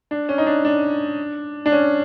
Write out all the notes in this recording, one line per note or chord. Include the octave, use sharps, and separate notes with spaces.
D4
C#4
D#4
D4
D4
D4
C#4